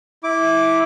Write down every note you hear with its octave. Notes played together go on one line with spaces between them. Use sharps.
E4 D6